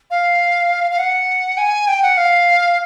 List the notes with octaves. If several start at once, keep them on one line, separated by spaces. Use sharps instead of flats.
F5
F5
F#5
G#5
G5
F#5
F5